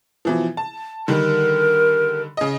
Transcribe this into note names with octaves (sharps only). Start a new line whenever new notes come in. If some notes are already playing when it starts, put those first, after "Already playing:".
B2 E3 F3
A5
D3 D#3 G3 A#4
C#3 D#5